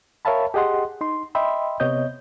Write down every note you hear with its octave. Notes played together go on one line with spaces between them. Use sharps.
A#4 C#5 E5 F5 A5 B5
G4 G#4 D#5 F#5 C6
D#4 C6
D#5 E5 G5 B5 C6
C3 B3 C#5 D#5 G6